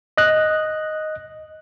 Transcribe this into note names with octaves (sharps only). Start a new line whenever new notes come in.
D#5 F#6